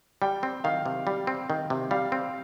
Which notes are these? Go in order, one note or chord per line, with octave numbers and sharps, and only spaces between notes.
G3 G5
C4
D#3 F5
C3
G3
C4
D#3
C3
G3 F5
C4